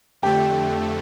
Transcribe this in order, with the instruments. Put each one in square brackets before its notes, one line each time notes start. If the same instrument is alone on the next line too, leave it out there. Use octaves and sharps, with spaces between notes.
[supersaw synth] F2 D3 A3 [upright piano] G4